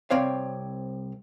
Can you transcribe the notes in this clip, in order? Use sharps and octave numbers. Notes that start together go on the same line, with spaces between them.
C2 C4 C#5 D5 F5